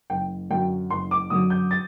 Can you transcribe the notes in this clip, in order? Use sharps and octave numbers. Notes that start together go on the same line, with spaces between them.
F#1 G5
F#2 D3 F#3 G5
F#1 C6
D6
F#2 D3 F#3 D#6
G6
A6